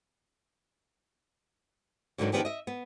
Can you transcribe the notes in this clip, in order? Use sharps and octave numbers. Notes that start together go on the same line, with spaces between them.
G#2 D3 D#3 F3 F#3 D4
D#3 F3 B3 D4 G4 G#4
D#5 E5
B3